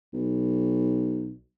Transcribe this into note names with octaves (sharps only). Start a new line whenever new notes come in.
B1